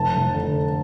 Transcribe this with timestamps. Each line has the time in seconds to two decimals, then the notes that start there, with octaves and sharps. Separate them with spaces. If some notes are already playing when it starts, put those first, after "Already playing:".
Already playing: F1 A5
0.14 F1
0.34 D3